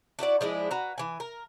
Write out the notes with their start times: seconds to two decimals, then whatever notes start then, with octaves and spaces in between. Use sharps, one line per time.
0.19 D4 E4 F#4 D5
0.41 F3 G#3 D4 E4
0.71 F#4 B4 A#5
0.98 E3 G#5
1.20 A#4